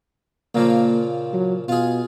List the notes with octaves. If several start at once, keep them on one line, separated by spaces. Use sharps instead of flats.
A#2 C#3 F3 A#3
F#3
B2 F4 G#4